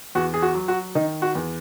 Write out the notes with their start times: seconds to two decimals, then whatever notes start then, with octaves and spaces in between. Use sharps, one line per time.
0.15 E2 F#4
0.34 G#4
0.42 F#4
0.55 F#3
0.68 F#4
0.95 D#3 D#4
1.22 F#4
1.35 E2